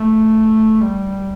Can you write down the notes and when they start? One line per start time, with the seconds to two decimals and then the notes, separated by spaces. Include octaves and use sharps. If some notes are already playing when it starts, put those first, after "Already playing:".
Already playing: A3
0.81 G3